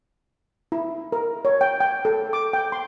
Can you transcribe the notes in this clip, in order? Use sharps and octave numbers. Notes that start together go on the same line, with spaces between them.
E4
A#4
C#5
G5
G5
A4
D6
G5
C6